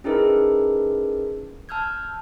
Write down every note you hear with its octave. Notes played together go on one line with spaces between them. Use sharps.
C#4 D#4 E4 G#4 A#4 B4
A5 E6 F6 G6 G#6